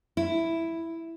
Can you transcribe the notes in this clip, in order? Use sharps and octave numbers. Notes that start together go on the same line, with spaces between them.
E4